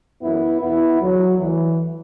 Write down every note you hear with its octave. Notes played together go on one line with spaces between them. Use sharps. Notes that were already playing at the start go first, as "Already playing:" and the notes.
F#2 E3 B3 E4
E2 B2 B3 E4
E2 D3 F#3
D2 D3 E3